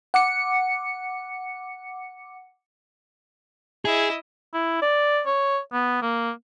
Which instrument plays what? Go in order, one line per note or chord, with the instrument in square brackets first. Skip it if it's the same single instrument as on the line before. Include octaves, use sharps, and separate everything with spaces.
[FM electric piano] F#5 D6 C#7
[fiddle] E4 D#5 [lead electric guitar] G#4
[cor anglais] E4
D5
C#5
B3
A#3